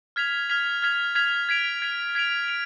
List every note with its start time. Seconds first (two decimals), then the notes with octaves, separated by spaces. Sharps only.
0.16 F6 G#6 B6 F7
0.50 F6 G#6 B6 F7
0.82 F6 G#6 B6 F7
1.15 F6 G#6 B6 F7
1.49 G#6 B6 D7 F7
1.82 G#6 B6 D7 F7
2.15 G#6 B6 D7 F7
2.48 D7 F7